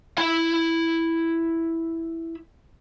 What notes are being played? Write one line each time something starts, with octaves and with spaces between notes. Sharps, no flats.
E4 B5